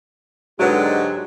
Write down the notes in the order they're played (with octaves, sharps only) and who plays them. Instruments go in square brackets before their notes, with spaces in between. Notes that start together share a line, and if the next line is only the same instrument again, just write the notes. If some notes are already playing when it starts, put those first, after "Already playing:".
[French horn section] G#2 G4 [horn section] D3 G#3 [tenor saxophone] F#3 [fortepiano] F#4 B4